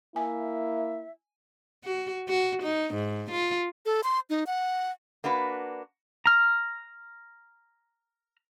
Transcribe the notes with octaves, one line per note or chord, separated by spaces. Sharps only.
A#3 E4 E5 G#5
F#4
F#4
D#4
G#2
F4
A4
C6
D#4
F#5
A#3 D4 F#4 B4
A#5 F6